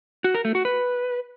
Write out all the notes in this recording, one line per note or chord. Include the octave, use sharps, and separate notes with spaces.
F#4
A#4
A3
F#4
B4